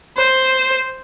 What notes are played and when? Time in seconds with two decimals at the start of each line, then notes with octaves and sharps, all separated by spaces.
0.17 C5